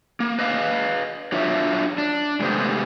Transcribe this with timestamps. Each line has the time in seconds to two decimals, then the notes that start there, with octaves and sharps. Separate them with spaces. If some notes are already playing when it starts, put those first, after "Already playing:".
0.20 A#3
0.39 B4 D#5 F5
1.32 F#3 D4 F4 C#5 E5
1.98 D4
2.40 C3 G#3 A3 B3 G4 C5